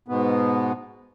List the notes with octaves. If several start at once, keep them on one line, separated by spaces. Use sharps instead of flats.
G#2 B2 B3